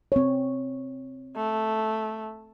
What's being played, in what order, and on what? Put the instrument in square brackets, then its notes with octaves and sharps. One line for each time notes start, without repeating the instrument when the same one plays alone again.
[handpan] C4 C#5
[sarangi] A3